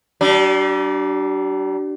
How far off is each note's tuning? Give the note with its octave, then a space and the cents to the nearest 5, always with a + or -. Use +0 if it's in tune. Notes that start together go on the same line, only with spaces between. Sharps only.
G3 -45 D4 +0